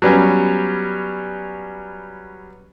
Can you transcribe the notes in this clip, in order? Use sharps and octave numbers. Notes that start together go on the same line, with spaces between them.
F#3 G3 B3 C#4